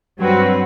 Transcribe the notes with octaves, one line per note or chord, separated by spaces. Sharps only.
G2 F#3 C4 F#4 B4